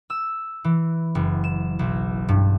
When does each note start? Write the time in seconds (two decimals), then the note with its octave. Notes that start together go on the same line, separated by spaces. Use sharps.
0.10 E6
0.64 E3
1.15 F#1
1.44 E7
1.79 B1
2.29 G2